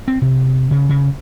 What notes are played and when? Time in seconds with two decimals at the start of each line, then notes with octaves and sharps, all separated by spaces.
0.08 C4
0.22 C3
0.71 C#3
0.89 C#3